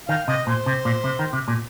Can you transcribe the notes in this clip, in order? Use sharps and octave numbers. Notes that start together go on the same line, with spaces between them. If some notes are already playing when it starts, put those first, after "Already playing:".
D#3 F5
C3 D#5
A#2 C5
C3
A#2
C3
D#3
C3
A#2